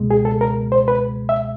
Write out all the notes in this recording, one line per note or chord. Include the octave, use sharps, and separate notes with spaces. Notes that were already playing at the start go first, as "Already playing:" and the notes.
Already playing: C#2 B2 G#3
G#4
A4
A#4
C5
B4
E5